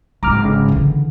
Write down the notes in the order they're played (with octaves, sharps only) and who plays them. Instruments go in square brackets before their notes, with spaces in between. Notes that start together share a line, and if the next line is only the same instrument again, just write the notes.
[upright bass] G#1 [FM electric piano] A#5 D6 F6
[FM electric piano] C#3
[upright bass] D3 E3